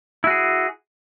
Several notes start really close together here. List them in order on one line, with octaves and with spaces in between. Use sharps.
E4 F#4 G#4